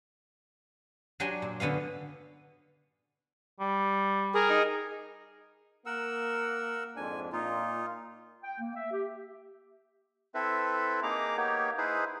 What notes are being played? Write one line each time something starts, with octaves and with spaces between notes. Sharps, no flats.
F#3 D4 G4 G#5 C6
A#2
D3 B3 C#4 F5
G3
G#4 A#4
D#4
A#3 A#4 F#5 E6
F2 G#2 D4 G#5
A#2 D#4 F4
G5
A#3
E5
G4
C4 E4 A4 B4 E5
A#3 D#4 G#4 A#5 D6
A#3 B3 D#4 G4 C#5
D#4 E4 G#4 B4 C5